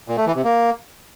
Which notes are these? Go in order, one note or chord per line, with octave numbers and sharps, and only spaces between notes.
A#2
A3
E3
C3
A#3